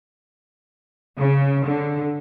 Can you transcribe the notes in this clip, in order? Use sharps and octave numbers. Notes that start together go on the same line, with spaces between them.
C#3
D3